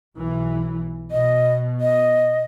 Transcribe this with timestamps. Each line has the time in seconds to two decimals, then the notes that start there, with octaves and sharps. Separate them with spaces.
0.18 B1 E3
1.11 B2 D#5
1.81 D#5